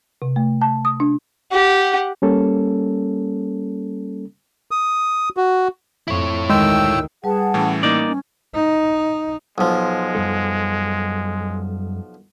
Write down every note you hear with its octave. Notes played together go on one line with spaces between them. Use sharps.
C3
A3
A5
D#6
D4
G4 F#5
G3 A#3 C#4 A4
D#6
F#4
F2 E4 C#5
D2 D#3 G#3 G5 E6
G3 G#4 B4 F#5 A5
A2 E3 C#4 G5
A#3 D#4 D5
C#4
D#4
B1 F3 G#3
F#2 G3 A4